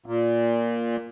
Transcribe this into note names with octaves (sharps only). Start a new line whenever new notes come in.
A#2